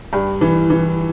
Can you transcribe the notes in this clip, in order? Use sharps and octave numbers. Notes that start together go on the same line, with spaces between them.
G2
E3
E3